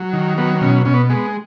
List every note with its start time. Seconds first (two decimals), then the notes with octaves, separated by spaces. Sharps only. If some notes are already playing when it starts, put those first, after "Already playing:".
Already playing: F#3
0.13 D#3
0.37 F#3 B3
0.61 B2 C#4
0.85 B2 C#4
0.94 B3
1.10 G#3 B3